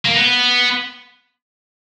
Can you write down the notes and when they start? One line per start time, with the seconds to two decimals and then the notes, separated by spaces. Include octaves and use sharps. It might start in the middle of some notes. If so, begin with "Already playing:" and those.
0.05 A#3
0.14 B3